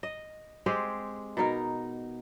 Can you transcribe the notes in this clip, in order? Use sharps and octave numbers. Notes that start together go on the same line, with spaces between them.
D#5
G#3 C4 G4 G#4
B2 D#4 A#4